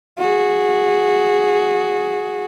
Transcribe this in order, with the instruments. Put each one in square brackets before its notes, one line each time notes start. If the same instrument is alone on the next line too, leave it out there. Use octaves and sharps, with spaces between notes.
[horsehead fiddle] F#4 G#4